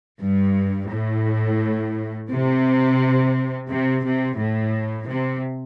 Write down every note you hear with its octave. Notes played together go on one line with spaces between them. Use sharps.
G2
A2
C3
C3
C3
A2
C3